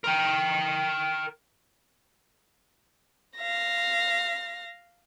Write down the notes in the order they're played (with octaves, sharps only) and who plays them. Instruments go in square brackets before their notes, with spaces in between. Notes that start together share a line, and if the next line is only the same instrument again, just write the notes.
[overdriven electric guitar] A#4 G5
[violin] F5 A#6